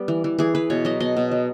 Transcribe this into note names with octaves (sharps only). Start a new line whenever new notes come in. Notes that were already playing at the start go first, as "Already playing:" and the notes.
Already playing: G3 B3
E3
E3
E3 G#4
E3 B4
B2 C#5
F#3 D#5
B2 D#5
B2
F#3